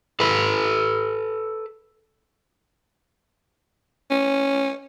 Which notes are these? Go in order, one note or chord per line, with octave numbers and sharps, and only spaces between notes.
A4 B4
C#4